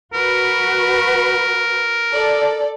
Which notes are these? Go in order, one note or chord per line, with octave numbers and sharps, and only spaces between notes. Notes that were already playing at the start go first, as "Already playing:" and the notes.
F#4 A#4 B4
A4 D5